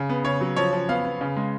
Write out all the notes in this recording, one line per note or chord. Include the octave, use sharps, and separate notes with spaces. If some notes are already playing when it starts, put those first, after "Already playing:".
Already playing: C#3
B3
C#3 C#5
F#3
F3 C#5
F3
B3 F5
B3
C#3
G#3